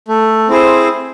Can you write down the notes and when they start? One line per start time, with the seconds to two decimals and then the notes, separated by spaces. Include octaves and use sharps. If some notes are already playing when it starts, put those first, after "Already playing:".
0.08 A3
0.48 C4 E4 G#4 C5